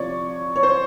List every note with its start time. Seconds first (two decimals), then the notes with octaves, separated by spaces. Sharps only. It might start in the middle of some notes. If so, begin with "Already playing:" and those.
Already playing: C3 F3 C#5 D5
0.56 C#5
0.63 C5